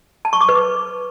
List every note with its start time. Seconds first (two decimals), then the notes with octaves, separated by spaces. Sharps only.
0.25 A5
0.33 C#6
0.41 D6
0.49 B4